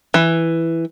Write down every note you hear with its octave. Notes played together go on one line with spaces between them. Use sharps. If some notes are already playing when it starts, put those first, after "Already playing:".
E3